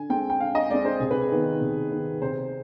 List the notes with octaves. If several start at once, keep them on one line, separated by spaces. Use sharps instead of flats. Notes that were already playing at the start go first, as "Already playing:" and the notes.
Already playing: D3 G#5
G#3 C4 G5
G5
D3 F5
D#5
G#3 C4 D5
C5
C3 G#4
B4
G#4
D#3 B3
C3
D#3 B3
C3 C5